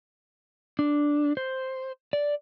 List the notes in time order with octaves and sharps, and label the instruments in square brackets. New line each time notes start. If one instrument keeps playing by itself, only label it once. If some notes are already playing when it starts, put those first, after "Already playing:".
[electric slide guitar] D4
C5
D5